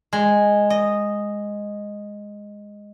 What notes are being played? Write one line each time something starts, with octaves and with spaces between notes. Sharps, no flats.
G#3
D#5